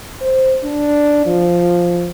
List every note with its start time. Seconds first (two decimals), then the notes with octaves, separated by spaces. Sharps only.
0.21 C5
0.64 D4
1.26 F3